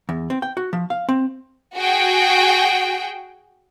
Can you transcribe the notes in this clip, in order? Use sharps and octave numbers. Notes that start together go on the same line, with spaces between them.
E2
C4
G5
F#4
F3
F5
C4
F#4 G#4 G5